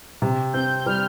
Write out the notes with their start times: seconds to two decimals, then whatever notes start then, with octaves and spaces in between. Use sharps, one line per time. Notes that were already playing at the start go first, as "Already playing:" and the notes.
0.22 C3
0.53 C4 G6
0.86 G3 F6